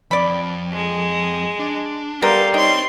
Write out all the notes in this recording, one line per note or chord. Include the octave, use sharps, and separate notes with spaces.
F2 D5 B5
G#3
D4
G3 B3 A4 A#4 F5 C6
D#4 C5 C#5 G5 C6